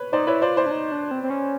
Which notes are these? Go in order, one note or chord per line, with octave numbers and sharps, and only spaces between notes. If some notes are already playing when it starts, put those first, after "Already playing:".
Already playing: B4 C#5
D#4 C5 D5
E4 B4 C#5
F4 C5 D5
E4 C5 D5
D4
D#4
D4
C4
C4
C#4